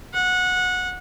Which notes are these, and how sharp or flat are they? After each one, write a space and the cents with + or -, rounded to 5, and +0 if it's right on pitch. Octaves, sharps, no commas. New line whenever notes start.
F#5 -20